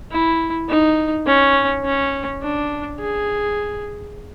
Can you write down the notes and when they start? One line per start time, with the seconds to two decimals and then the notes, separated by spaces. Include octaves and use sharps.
0.12 E4
0.70 D#4
1.27 C#4
1.85 C#4
2.43 D4
3.00 G#4